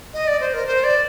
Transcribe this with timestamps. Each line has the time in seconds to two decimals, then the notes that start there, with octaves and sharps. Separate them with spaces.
0.14 D#5
0.27 D5
0.40 C5
0.53 A#4
0.66 C5
0.84 D5